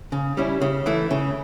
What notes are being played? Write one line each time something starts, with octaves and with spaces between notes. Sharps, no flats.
C#3
G3 C#4 E4
C#3
E3 A3 E4
C#3